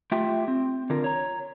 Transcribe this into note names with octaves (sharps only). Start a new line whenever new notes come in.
A3 F4 G4 E5 G5
C4
D3 F4 A#4
C#5 A#5